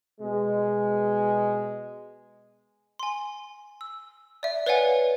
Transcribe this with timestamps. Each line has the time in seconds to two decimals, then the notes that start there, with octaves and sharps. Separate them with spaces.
0.21 B2 G#3
2.99 G#5 C6
3.81 E6
4.43 D5 E5
4.66 B4 C#5 D5 F5 F#5 G#5